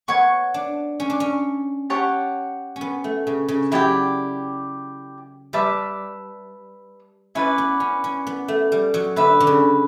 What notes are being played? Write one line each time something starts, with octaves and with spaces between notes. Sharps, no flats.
B3 C#5 F#5 C#6
D4
C#4
D4
C#4
G4 C#5 F#5 A5
C#4
B3
A3
C#3
C#3
F#3 E4 G4 D5 G5
G3 B4 E5 A5 D6
C#4 E4 B4 D5
B3
C#4
C#4
B3
A3
G3
F#3
D3 B4 E5 B5
D3
C#3